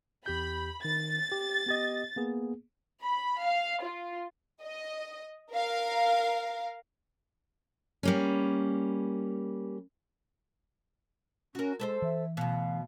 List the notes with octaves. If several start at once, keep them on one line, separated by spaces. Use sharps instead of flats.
E2 G4 B5 G6
D#3 A6
G4
B3 G4 D#5
A#3 B3 G#4
B5
F5
F4
D#5
A#4 F5
G3 A#3 C#4
C#4 F#4 A#4
G#3 A4 B4 C5
E3 E5
D2 B2 F5